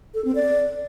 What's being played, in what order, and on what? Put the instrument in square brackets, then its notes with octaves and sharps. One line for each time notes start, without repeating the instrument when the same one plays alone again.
[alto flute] A4
C4
D5